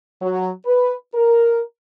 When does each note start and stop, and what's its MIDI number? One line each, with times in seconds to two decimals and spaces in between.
0.21 0.51 54
0.66 0.96 71
1.15 1.61 70